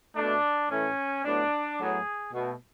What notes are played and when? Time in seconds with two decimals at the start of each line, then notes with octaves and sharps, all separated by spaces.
0.16 B2 A3 D4
0.70 A2 E3 A3 C#4
1.25 A2 F#3 B3 D4
1.78 A2 F#3 B3 G#4
2.33 B2 A3